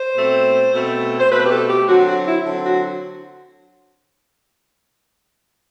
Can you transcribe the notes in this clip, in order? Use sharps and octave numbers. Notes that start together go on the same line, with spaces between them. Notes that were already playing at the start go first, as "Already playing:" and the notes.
Already playing: C5
B2 A3 C4
B2 A3 C4
C5
B2 A3 C4 B4
G4
A4
G4
D3 F#3 C4 F#4
F#4
E4
D3 F#3 C4
F#4